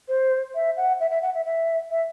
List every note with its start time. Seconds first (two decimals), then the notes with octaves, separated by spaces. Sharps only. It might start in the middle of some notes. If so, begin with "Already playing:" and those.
0.08 C5
0.55 E5
0.77 F#5
1.00 E5
1.11 E5
1.22 F#5
1.34 E5
1.46 E5
1.91 E5